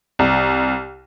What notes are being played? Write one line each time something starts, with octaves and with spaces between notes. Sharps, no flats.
C2